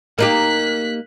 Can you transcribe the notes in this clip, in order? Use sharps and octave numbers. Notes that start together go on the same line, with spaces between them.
A#3 D#4 G4 F#6 B6